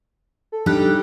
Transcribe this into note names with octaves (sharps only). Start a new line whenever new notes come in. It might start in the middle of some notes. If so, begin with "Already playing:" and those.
A4
G3 D4 D#4 G4 F#6